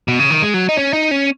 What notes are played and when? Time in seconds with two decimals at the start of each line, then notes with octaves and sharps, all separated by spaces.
0.08 B2
0.19 C#3
0.30 D#3
0.42 G#3
0.54 F#3
0.69 D#4
0.77 C#4
0.93 D#4
1.11 C#4